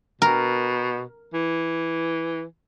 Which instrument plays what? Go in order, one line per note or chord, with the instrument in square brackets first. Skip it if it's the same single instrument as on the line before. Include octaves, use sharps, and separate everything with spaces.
[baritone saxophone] B2 [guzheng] A#4
[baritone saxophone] E3